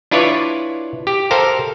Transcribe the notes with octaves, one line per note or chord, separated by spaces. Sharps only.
D4 E4 F4 B4 C#5 D5
G4
A4 A#4 C5 F5 A#5